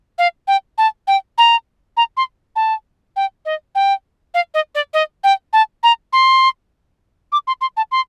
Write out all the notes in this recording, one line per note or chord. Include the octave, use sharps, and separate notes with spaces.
F5
G5
A5
G5
A#5
A#5
C6
A5
G5
D#5
G5
F5
D#5
D5
D#5
G5
A5
A#5
C6
D6
C6
C6
A5
C6